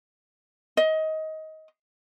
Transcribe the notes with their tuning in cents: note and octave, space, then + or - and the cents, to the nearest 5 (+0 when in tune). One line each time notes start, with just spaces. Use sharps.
D#5 +20